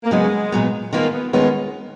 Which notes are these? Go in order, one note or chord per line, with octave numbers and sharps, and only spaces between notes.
A#3
C#3 F#3 G#3 B3 F#4
A#2 F#3 B3
D#3 G#3 A#3 B3 F4
B3
D#2 D#3 G#3 B3 C#4 F4